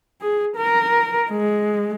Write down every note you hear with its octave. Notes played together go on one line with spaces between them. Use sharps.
G#4
A#4
G#3